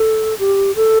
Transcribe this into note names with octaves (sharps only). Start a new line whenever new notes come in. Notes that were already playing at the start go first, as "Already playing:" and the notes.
Already playing: A4
G4
A4